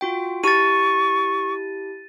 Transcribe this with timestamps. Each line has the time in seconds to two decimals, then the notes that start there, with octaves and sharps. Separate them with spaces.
0.01 F4 F#4 G5
0.44 E4 G4 A5 C#6 A6 D#7